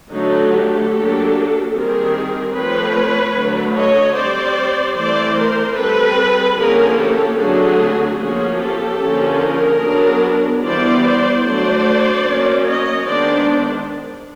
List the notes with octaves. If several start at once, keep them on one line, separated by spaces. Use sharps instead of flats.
D3 F#3 A3 D#4
G4 A4
F#3 A#3 D4
D#3 G3 C4 G#4 A#4
F3 A3 C4 B4 C#5
D3 F#3 A3
C#5 D#5
G3 C4 C5 D5
E3 A3 C4 C5 D5
A#4 C5
G3 C4 A4 B4
D3 F3 A#3 C#4 G#4 A#4
G4 A4
D3 F#3 A3 C4 F#4 G#4
F3 A#3 C#4 F#4 G#4
G4 A4
D3 F3 A#3 C#4
G#4 A#4
F#3 B3 D4
E3 G3 B3 C5 D5
C5 D5
D3 F#3 A3 D4 C5 D5
F#3 A#3 C#4
C#5 D#5
D#3 G#3 B3 D4 C5 D5